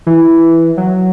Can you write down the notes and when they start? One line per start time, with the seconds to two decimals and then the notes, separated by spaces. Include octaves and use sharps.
0.07 E3
0.77 F#3